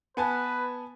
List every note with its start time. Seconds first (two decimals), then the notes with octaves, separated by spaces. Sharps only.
0.17 B3 B4 G#5 A5